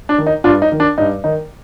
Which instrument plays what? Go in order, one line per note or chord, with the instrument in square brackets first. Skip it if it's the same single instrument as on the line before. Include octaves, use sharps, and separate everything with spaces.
[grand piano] D4
D#3
D#4
G2 D4 F4
D#4
D#3
D4
G2 D#4
D#3 D#4